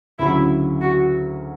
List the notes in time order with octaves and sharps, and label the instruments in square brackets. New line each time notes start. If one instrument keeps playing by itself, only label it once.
[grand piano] D2 C#3 F#3 [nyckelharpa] E4
[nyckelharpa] F#4